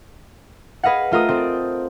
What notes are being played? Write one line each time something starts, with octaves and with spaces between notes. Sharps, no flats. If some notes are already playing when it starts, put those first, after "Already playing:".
G#4 B4 D#5 F5 F#5
A3 F4 A#4 D#6
C4 A4 C5